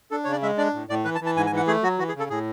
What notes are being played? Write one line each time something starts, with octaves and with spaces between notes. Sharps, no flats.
D4 A4
C#3 C#5
D5
G#3 E5
D4 D5
A2
A2 D5
E3 B4
A5
E3
A5
G#2 G#5
G#5
E3 F#5
A3 G#4
F#3 F#4
E3 F#4
G#4
C#3
A4
A2 G#4